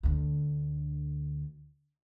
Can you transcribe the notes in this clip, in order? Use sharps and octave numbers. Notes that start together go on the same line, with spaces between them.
D2 D3